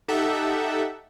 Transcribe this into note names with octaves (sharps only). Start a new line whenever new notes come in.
D#4 G4 A4 E5 F#5